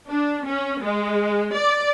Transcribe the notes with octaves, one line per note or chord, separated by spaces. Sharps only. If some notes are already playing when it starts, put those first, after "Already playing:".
D4
C#4
G#3
D5